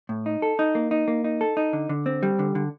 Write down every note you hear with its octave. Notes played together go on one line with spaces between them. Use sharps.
A2
D#4
A4
D#4
A#3
D#4
A#3
D#4
A4
D#4
D3
D3
C4
G3
D3
D3